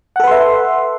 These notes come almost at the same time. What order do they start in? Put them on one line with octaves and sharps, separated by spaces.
F#5 A4 B4 C6 E5